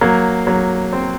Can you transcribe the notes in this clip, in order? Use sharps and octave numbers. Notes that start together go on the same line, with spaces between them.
F#3 A#3
F#3 A#3
C4